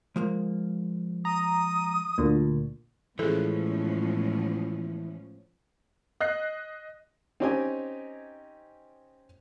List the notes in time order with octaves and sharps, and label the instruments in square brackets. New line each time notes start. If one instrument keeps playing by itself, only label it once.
[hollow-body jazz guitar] F3 G#3 A#3
[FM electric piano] A#5 [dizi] D#6
[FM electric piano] D2 A#2
[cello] A2 G#3 [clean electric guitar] E3 [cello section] F3 B3 C#4 [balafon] G#4 A4
[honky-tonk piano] D#5 F#6 C7
[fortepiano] C4 C#4 D#4 G4 D#5 G#5